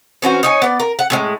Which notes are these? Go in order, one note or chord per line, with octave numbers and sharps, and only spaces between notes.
E3 C#4 F#4 C5
D#4 C#5 G#5
B3 D5
A#4
F#5
A2 E3 G#3